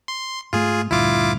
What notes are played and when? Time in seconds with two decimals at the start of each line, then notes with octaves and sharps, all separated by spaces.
0.08 C6
0.53 G#2 A3 F4 G#4
0.91 D2 G2 A#2 E4 F4 D6